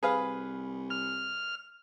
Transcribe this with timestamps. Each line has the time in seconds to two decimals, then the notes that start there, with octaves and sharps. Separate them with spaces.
0.03 C2 G#4 B4 F5
0.90 F6